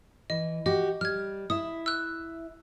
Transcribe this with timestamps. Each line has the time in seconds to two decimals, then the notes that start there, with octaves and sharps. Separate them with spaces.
0.30 E3 D#5
0.66 F#4 G4 D#5
1.01 G3 F6 G#6
1.50 E4 E5 D#6
1.86 E6 F#6